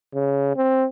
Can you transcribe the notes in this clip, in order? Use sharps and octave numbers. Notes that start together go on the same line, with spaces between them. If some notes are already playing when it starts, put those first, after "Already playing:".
C#3
C4